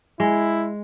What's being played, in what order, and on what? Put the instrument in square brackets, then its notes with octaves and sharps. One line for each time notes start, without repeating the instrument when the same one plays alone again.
[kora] G#3 [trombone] E4